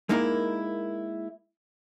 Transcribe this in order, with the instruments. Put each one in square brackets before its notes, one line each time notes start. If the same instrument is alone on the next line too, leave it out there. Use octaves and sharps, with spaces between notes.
[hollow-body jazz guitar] G#3 A#3 D#4 E4 A#4